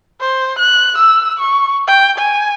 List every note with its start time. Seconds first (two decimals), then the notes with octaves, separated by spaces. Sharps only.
0.20 C5
0.59 F#6
0.98 E6
1.39 C#6
1.88 G5
2.18 G#5